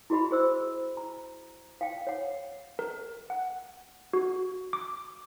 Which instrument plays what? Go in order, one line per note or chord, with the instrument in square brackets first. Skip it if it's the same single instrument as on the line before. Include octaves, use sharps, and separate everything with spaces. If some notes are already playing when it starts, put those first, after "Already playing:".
[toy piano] E4 F#4 G#4 D#5 B5
G#4 C5 E6
A#5
F5 G5
C#5 F#5
[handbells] A#4
F#5
F#4
D6